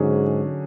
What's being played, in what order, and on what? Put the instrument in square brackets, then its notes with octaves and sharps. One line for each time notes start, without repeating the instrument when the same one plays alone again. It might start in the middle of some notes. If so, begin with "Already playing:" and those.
Already playing: [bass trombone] G#2 [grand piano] D3 F#3 C#4 G#4